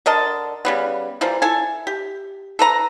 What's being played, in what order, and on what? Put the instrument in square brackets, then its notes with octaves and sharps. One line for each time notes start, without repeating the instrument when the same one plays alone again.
[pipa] D3 A#4 D#5 A5
C#3 G3 B3
E3 F3 G3 A#3
E4 A4 G#5
G4
A4 B4 A#5